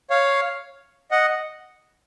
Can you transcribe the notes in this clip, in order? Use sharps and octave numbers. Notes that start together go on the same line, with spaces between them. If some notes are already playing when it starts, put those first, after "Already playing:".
C#5 F5
D#5 F#5